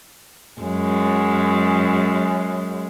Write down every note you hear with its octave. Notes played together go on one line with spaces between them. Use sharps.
F#2 G#3